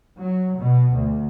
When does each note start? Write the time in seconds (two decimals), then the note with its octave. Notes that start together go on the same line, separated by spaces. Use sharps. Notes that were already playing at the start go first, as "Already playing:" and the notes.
0.20 F#3
0.59 B2
0.96 D2